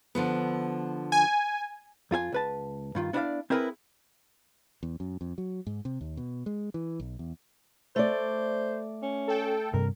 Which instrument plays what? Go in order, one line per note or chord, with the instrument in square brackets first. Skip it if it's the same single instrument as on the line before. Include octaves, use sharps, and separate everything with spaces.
[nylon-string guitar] D3 F3 B3
[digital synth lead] G#5
[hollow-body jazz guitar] F2 F4 G#4 G#5
C#2 B4 A5
G2 D#3 F4
B3 D4 E4 C5 D5 F5
C4 E4 G#4 A#4 B4
[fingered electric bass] E2
F#2
F2
F#3
G#2
C3
D#2
B2
G#3
E3
B1
E2
[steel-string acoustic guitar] A3 D5 [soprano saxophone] C5
[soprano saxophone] C#4
[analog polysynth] A4 G5
[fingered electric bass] G2 C3 [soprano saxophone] A#4